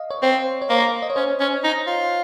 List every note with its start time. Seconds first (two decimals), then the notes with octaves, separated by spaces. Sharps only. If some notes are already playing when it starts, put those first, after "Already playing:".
Already playing: D#5 F5
0.10 C#5
0.22 C4 C5
0.62 C#5
0.69 A#3 C5
1.02 D#5
1.10 C#5
1.16 C#4 C5
1.40 C#4
1.64 D#4
1.87 F4